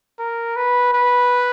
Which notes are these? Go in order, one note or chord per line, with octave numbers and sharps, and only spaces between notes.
A#4
B4
B4